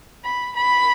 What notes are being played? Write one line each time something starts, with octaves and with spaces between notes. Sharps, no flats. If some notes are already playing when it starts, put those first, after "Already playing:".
B5
B5